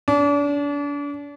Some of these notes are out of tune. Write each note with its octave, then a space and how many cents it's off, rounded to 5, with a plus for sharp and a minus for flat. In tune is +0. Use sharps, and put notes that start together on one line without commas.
D4 -35